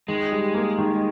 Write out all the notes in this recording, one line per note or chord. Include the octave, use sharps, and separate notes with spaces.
D#3 G#3
G3
A#3
D#3